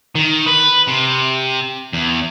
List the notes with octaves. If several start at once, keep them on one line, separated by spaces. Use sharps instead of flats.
D#3
B4
C3
E2